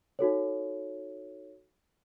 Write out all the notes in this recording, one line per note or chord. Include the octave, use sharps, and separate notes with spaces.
D#4 F#4 A4 C#5